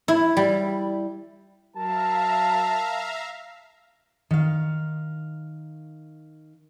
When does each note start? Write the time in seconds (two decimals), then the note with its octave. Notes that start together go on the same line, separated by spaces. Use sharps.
0.08 E4
0.37 G3
1.76 F#3 A#4 E5 F5 A5 A#5
4.31 D#3 F5